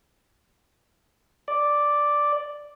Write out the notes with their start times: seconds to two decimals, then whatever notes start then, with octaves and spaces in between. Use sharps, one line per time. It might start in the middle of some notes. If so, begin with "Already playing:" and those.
1.48 D5